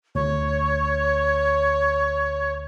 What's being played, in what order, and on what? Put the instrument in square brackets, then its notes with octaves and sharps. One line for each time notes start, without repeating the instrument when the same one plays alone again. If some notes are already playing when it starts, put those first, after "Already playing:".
[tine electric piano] D2 [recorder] C#5